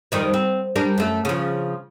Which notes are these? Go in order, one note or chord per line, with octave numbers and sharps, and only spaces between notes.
F2 D#3 G3
C4
G3 D4 A#4
F#2 A3
C#3 F3